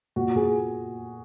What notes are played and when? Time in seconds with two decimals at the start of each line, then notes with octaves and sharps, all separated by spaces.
0.16 A#2 F#4
0.36 A#2 G#4